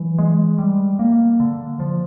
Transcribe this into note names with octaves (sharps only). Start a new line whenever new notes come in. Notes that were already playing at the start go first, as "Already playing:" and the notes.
Already playing: E3 F#3
G#3
G3
A#3
D3
F3